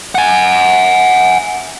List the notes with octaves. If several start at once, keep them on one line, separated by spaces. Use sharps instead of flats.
F#5 G#5